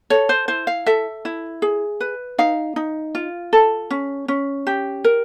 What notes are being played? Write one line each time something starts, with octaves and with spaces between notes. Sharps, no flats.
A4 C#5
C5
E4 C5
F5
A4 E5
E4
G#4
B4
D#4 F5
D#4
F4
A4
C#4
C#4
G4
A#4